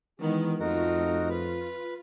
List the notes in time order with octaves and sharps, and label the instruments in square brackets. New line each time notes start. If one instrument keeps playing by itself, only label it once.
[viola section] D#3 G#3 B3 [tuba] E3
[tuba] F2 [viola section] A3 F4 [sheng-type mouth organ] D#4 F#4 A#4
[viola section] F4 [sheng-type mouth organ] B4